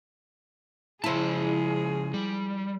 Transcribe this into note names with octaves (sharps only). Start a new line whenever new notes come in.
C#3 F3 G#3 E4 G#4 C5 F5 A5
G3